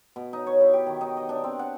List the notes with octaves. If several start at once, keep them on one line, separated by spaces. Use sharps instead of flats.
B2
D#4
C#5
E4
G4
D#3
D#4
D#5
D4
C4
F#5